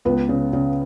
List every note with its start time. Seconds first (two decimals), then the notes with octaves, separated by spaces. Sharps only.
0.05 C#2 B3 B4
0.29 C#3
0.53 C#3